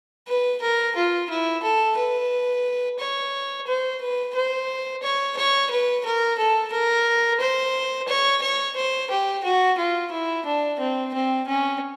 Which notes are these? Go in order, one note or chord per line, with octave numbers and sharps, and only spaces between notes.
B4
A#4
F4
E4
A4
B4
C#5
C5
B4
C5
C#5
C#5
B4
A#4
A4
A#4
C5
C#5
C#5
C5
G4
F#4
F4
E4
D4
C4
C4
C#4